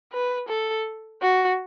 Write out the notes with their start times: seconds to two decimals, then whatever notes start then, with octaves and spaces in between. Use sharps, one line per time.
0.12 B4
0.49 A4
1.22 F#4